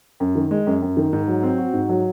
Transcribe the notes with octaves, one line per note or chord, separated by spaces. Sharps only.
F#2
D#3
G#3
F#2
F#2
D#3
G#2
F#3
C4
F#4
G#2
F#3